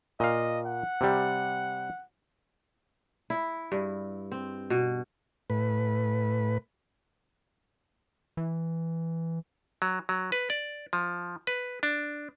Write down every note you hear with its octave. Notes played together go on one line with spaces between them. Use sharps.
A#2 D#5 F5
F#5
C3 G3
E4
G2
C4
B2
A2 B4
E3
F#3
F#3
B4
D5
F3
B4
D4